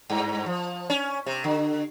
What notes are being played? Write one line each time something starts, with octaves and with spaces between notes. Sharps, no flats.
G2
F3
C#4
C3
D3